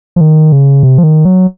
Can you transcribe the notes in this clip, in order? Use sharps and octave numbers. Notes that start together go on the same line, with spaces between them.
F3
D#3
C#3
C3
F3
D#3
F#3